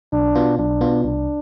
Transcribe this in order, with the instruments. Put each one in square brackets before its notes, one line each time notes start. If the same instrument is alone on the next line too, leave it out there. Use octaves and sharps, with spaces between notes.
[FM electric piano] B1 [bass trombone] D4
[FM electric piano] B2 B3 F4
[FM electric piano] B1 [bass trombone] D4
[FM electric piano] B2 B3 F4
[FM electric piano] C2 [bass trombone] D4